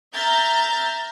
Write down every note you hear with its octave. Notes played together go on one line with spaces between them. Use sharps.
E5 A#5 F6 G6 A6